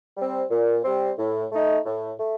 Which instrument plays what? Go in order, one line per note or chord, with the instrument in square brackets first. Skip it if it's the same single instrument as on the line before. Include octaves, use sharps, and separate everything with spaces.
[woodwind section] G3 C4
A#2
G3 C4
A2
A3 D#4
A2
A3